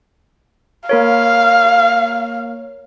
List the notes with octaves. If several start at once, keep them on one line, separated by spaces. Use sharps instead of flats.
A#3 A#4 C#5 F5